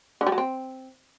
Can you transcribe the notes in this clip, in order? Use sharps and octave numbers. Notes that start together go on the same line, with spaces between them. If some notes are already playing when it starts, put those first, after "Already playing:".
D3
G3
F#3
C4